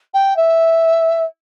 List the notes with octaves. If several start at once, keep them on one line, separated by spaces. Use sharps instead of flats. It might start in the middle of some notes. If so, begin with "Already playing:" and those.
G5
E5